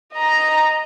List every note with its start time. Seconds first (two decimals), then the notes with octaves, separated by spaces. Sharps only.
0.14 D#5 A#5